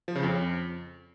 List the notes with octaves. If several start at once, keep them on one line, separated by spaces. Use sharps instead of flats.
F3
C#3
F2